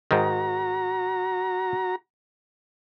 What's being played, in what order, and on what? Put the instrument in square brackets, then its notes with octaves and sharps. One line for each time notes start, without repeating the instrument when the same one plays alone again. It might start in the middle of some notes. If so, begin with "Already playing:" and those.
[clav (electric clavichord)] G#2 D#3 [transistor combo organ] F#4 A#5